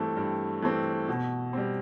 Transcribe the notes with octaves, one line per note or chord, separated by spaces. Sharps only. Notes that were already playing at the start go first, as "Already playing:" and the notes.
Already playing: G2 E3 A3 C4
G2
E3 A3 C4
B2
G3 C4